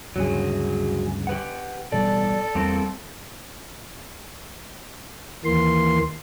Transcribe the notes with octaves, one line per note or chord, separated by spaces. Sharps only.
D2 G2 C#3 F#3 G#4
G4 B4 F#5
A1 B2 G3 A4 D5
E2 G3 A#3 C4
D#2 E3 A#3 C6